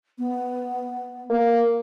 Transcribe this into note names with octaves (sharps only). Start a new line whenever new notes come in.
B3
A#3